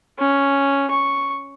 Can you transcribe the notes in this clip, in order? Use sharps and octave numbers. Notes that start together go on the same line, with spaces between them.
C#4
C#6